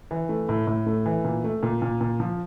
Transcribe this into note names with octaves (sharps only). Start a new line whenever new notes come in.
E3
A3
A2
A2
A3
E3
A#2
A3
A#2
A#2
A#2
F3